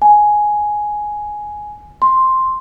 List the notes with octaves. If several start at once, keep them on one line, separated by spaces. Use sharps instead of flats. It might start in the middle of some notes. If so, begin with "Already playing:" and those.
G#5
C6